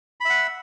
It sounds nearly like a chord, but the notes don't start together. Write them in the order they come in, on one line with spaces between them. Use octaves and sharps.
B5 E5 F#5